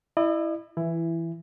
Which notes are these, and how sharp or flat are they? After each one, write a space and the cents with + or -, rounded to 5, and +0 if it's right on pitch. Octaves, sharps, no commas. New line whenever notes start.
E4 +0 D#5 -45
E3 +5 E4 +15